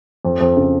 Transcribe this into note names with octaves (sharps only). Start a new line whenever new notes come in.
F2
F2
C#3